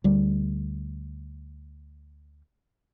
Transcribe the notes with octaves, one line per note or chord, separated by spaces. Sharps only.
D2 G3